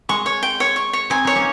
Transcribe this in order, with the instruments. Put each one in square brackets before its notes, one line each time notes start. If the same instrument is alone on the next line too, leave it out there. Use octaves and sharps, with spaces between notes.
[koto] G#3 [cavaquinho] C#6
[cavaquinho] C#5
G5
C#5
C#6
C#5
[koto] C4 D#4 [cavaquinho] G#5
[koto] D#4 [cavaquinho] C#5
[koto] A#3 C#4